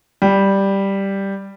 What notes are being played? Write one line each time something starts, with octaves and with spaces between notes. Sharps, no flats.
G3